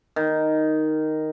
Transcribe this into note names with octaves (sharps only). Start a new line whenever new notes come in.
D#3